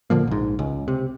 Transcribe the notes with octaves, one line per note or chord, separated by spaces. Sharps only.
A#2 D3 F3 A#3
A#1 G#2
C#2
C3